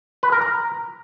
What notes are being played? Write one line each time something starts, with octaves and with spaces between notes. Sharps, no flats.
B4
A#4
A#5